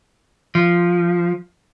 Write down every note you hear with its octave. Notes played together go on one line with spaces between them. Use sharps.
F3